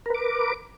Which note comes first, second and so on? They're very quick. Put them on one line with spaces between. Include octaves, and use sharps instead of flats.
A#4 B4 D6